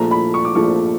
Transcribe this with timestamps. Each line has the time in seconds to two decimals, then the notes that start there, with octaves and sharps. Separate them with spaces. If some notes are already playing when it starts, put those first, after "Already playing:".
Already playing: A#1 A#2 F3 A3 A#5
0.11 B5
0.34 C#6
0.45 D6
0.55 A#1 A#2 F3 A3 C#6